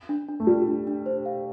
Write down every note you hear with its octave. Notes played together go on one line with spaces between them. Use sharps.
D4
D4
A3
G3 F4
D4
D4
C5
F5